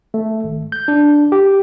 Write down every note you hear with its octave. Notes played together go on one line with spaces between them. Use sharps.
A3
G#1
G6
D4
G4